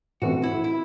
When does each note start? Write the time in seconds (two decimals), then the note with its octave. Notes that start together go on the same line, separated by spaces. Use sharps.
0.22 A2 E3 A3 C4 F#4
0.43 E4
0.64 E4